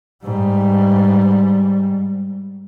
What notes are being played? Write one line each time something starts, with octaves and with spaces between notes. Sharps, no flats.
G#2 G3